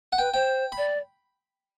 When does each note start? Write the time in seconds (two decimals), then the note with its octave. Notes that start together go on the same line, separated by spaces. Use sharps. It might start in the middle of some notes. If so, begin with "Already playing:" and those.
0.12 F#5
0.18 B4 G5
0.34 C5 G5
0.72 B5
0.77 D5